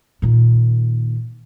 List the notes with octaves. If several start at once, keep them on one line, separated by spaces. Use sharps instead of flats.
A#2 D#3